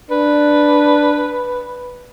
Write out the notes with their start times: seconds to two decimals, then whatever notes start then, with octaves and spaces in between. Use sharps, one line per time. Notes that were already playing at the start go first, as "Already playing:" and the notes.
0.11 D4 B4